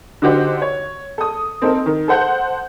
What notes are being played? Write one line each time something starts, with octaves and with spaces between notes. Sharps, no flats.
D3 D4 D#4 F#4 G4 C5
C#5
A4 D#6
C4 D#4 A4 A#4
D#3
A4 C5 F#5 G6